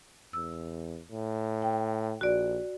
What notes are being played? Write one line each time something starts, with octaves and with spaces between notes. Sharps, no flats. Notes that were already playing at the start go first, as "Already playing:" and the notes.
E2 E6
A2
G5
A#1 F#4 D5